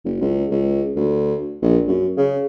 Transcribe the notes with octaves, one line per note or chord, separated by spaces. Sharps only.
F#1
C#2
C#2
D2
A#1
F#2
C#3